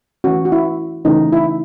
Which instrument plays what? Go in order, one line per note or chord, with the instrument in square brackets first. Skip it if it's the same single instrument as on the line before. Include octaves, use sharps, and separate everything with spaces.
[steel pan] E3 A3 C#4 F#4
F#4
E4
C#3 E3 A3 C#4 D#4
E4